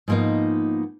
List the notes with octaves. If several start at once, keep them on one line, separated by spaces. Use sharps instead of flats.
G#2 F3 A#3 B3 D#4